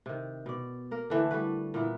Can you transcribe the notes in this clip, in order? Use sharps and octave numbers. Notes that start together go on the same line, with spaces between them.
C3 D#3
B2 D5
A#3 A#4
D3 E3 A3 D4
G3 A3 F#4 B4
A#2 E3 B3 E4